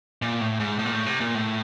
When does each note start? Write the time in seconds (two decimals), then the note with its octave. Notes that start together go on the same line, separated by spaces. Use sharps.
0.22 A#2
0.40 A2
0.60 G#2
0.79 A2
0.86 A#2
0.92 A2
1.06 C3
1.20 A#2
1.35 A2